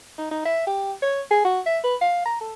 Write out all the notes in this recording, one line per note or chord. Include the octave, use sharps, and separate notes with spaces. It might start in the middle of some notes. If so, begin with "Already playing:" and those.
D#4
D#4
E5
G4
C#5
G#4
F#4
E5
B4
F5
A#5
A4